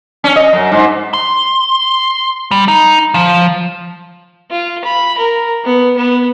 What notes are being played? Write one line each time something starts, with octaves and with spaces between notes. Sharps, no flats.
C#4
D#5
F#2
G#2
C6
G3
D#4
F3
F4
B5
A#4
B3
B3